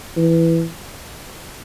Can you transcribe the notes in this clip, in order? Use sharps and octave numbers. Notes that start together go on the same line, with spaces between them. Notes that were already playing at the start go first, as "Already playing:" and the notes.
E3